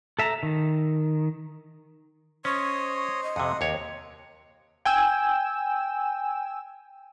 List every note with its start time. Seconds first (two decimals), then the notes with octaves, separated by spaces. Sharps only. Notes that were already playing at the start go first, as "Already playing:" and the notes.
0.19 A4 E5 A5 A#5
0.43 D#3
2.45 C#4 C5 C#5 D#5 C#6 D#6
3.23 D#5
3.36 F2 C3 F#5 D#6
3.61 D#2 C#5 D6
4.85 G5 G#5 E6